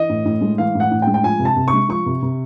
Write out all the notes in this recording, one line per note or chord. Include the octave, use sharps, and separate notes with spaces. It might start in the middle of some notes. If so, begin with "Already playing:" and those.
Already playing: E3 D#5
A2
A2
G#3
E3 F5
A2
F#5
A2
G5
G#3
G5
F3 G#5
C3
A5
C3
C#6
G#3
F3 C#6
C3
C3